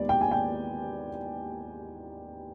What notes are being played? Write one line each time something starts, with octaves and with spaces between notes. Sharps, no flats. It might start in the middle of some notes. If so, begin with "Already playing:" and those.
Already playing: D#2 G#3 B3 G4 D5
G5
G#5
G5